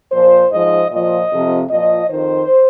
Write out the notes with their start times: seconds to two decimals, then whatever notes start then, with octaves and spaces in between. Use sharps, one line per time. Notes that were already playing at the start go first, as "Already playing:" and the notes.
0.12 A#2 F3 C5
0.52 G#2 F3 D#5
0.92 A#2 F3 D#5
1.32 F2 C3 F3
1.71 A#2 F3 D#5
2.11 F2 D#3 C5